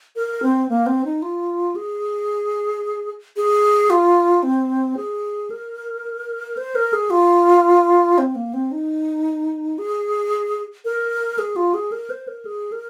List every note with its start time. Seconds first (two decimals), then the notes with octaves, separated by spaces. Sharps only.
0.16 A#4
0.43 C4
0.69 A#3
0.86 C4
1.05 D#4
1.22 F4
1.76 G#4
3.37 G#4
3.90 F4
4.43 C4
4.97 G#4
5.51 A#4
6.57 C5
6.75 A#4
6.93 G#4
7.10 F4
8.18 C4
8.35 A#3
8.54 C4
8.72 D#4
9.78 G#4
10.85 A#4
11.38 G#4
11.56 F4
11.74 G#4
11.92 A#4
12.10 C5
12.28 A#4
12.46 G#4
12.72 A#4